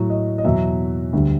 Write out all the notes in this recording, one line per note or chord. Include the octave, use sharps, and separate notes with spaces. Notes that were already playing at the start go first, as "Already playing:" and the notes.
Already playing: A2 F#3
D#5
D#5
E2 B2 F#3 E5
D2 D3 G3